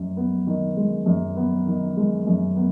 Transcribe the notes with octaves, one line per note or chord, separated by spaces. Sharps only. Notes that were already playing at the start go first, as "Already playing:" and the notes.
Already playing: F#2
B3
D#3
G#3
F#2
B3
D#3
G#3
F#2
B3